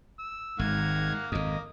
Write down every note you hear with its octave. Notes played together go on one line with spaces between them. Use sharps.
E6
G#1 G#2 D#3 A#3 F#5 F6 G#6
G#1 F2 A#3 D#5